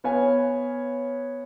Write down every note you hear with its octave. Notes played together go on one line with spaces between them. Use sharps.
B3 B4 C#5 F5 G#5